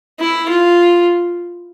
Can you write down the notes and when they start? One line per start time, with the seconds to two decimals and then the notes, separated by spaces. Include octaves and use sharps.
0.19 E4
0.48 F4